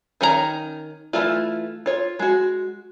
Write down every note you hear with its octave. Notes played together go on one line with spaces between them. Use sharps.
D#3 C#4 F4 A#5
E3 A3 E4 F4
F4 C#5
G#3 F#4